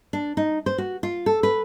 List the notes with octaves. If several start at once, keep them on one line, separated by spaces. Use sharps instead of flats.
D4
D#4
C5
F#4
F4
A4
B4